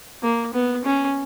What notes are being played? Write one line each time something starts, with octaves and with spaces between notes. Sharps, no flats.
A#3
B3
C#4